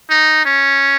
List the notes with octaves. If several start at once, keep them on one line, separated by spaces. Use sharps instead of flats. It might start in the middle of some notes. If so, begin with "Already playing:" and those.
D#4
C#4